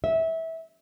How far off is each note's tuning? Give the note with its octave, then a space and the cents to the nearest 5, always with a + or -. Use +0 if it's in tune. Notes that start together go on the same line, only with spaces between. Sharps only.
E5 -20